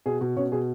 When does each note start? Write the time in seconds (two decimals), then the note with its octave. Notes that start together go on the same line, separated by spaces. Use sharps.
0.06 B2 G#4
0.21 B2
0.37 B2 C#4 C#5
0.52 B2 G#4